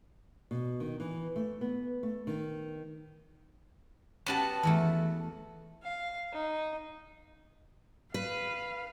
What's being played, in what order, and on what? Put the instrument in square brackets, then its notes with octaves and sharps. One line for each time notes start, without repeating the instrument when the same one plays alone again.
[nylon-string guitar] B2
D#3
E3
A3
B3
A3
D#3
[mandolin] B3 F#4 A5 [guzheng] C#4 G4
[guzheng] E2 E3 A3
[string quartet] F5
D#4
[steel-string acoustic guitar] B4 [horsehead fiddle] F5